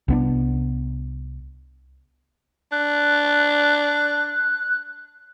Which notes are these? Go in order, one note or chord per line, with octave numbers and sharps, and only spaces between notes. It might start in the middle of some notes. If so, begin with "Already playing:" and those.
C2 B3 D4
D4 F#6